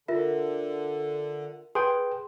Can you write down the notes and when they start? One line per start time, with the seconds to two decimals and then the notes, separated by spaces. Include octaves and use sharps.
0.08 D3 F4 A#4 E5
1.75 G#4 B4 G5 C6